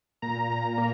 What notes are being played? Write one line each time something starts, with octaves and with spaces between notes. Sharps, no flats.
A#2 A#5
A#2
A#3